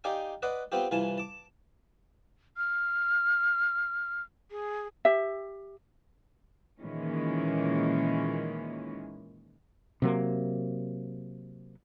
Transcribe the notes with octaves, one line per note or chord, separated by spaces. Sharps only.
D#4 G4 D5 F5 G#5
B4 D5 D#5 F#5 C6
B3 C4 F4 G4
C2 E3 F4 G#5 A5
A5 D6
F6
G#4
G4 E5
A#2 D#3 E3 G#3 C#4
C3 F#3 A#3